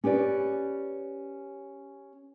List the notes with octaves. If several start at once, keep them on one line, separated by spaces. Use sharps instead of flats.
C#4 G4 B4 D5